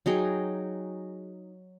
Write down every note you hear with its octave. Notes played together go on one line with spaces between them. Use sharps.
F#3 D#4 G#4 G5